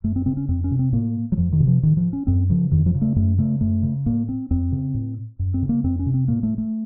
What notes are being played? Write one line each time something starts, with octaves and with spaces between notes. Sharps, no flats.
F#2 A3
C4
C#3 C4
C#4
F2 C4
C#4
C3
C4
A2 A#3
F#3
F2 F3
D#3
C3
F3
A2 D#3
F3
C#4
F#2 C4
C#3 F3
F2 D#3
F3
C#3
A3
F#2 A3
C#3 A3
F#2 A3
C#3
A2 A#3
C4
F2 C4
C#3
A2
F#2
C4
C#3
A#3
F2 C4
C#4
C3
C4
A2 A#3
A3
A3